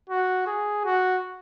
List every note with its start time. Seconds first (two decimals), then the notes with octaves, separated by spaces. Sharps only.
0.10 F#4
0.47 G#4
0.85 F#4